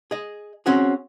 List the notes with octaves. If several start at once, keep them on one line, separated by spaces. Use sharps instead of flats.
G#4 D#5
C4 C#4 F#4 G#4